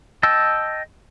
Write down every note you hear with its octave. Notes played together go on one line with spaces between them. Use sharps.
D#5 G5 A5 E6